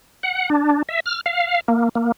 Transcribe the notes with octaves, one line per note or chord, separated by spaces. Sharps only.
F#5
D4
E5
F6
F5
A#3
A#3